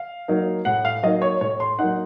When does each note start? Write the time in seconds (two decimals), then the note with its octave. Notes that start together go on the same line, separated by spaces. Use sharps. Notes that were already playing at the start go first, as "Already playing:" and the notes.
Already playing: F5
0.28 F#3 A#3 D#4
0.65 A2 F#5
0.85 F5
1.03 F#3 A#3 D#4 D#5
1.22 C#5
1.41 A2 C#5
1.60 C6
1.79 F#3 A#3 D#4 F#5